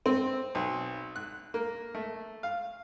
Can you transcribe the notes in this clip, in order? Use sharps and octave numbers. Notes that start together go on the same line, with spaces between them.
C4
B1
F#6
A#3
A3
F5